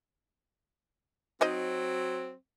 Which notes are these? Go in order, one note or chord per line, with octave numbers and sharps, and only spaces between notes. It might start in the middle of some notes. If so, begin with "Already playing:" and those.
F#3 C4 D#4 C5 D#5